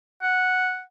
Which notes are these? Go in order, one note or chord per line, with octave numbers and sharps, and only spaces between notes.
F#5